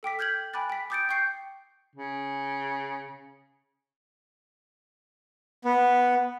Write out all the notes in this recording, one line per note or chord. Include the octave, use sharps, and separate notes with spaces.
A4 G5 D6 B6
F6 G6 G#6 B6 F#7
G5 G#5 B5 D6 F#6 A6
G5 B6
D6 D#6 G6 A6 C#7 D7
G5 C#6 G6 C7 C#7
C#3
B3